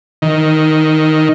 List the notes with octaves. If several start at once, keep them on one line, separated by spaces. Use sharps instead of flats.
D#3